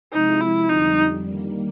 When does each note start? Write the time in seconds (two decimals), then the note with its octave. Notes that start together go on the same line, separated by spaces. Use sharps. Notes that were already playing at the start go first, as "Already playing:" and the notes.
0.12 C3 F3 G#3 C4 D#4 E4
0.41 E4
0.69 F2 D3 G3 D#4
1.27 D#3 G3 A#3